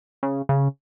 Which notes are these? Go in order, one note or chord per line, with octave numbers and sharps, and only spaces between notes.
C#3
C#3